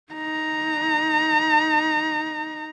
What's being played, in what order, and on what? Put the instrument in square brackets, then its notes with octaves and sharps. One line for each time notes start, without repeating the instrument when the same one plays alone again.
[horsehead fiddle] D#4 A#5